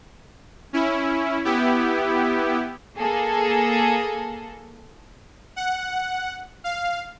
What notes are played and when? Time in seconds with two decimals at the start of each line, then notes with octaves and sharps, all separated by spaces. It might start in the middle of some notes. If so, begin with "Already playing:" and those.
0.73 C#4 E4
1.45 B3 E4 G4
2.96 A#3 G#4 A4
5.56 F#5
6.64 F5